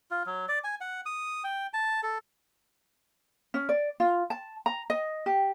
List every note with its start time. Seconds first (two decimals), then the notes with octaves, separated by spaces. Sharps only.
0.11 F4
0.26 F#3
0.49 D5
0.64 G#5
0.81 F#5
1.06 D#6
1.44 G5
1.73 A5
2.03 A4
3.54 C#4
3.69 D5
4.00 F4
4.30 A5
4.66 A#5
4.90 D#5
5.26 G4